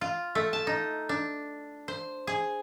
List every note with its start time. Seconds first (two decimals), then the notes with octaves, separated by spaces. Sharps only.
0.01 F4
0.35 A3
0.53 A5
0.67 D#4
1.09 D4
1.88 C5
2.27 G#4